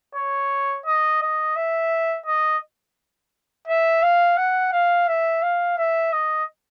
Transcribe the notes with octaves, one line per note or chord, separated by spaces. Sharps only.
C#5
D#5
D#5
E5
D#5
E5
F5
F#5
F5
E5
F5
E5
D#5